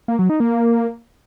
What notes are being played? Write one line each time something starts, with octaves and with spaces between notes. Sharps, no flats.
A#3
F#3
D#4
A#3